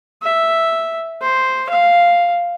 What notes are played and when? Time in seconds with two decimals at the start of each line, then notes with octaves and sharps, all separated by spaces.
0.23 E5
1.22 C5
1.70 F5